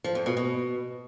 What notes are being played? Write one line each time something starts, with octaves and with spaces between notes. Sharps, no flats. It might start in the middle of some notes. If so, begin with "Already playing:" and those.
F3
F2
B2
B2